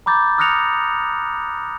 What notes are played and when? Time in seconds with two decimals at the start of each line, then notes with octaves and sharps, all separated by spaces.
0.06 A#5 B5 D6 G6 A6
0.38 D#6 F6 F#6 A#6 C#7 F7